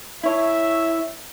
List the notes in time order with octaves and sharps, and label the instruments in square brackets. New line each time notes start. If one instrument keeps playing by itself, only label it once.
[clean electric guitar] E4 C#5 [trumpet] E5